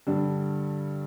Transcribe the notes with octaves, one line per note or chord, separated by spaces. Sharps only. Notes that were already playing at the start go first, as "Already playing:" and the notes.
G2 D3 G3 D4